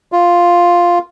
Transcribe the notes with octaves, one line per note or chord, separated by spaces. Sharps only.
F4